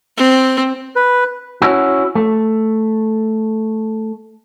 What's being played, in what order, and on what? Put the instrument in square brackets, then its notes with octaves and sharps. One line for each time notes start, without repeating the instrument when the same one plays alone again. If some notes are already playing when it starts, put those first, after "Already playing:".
[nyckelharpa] C4
[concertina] B4
[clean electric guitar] C#4 E4 F#4
A3